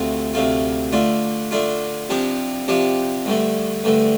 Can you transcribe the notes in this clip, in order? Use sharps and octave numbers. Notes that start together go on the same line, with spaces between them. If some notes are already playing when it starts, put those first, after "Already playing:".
Already playing: D2 C3 A3 F4
D2 C3 A3 F4
D3 A3 D4 F4
D3 A3 D4 F4
C3 F3 D4 G4
C3 F3 D4 G4
G2 D3 A3
G2 D3 A3